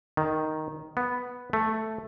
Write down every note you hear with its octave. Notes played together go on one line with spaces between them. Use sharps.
D#3
B3
A3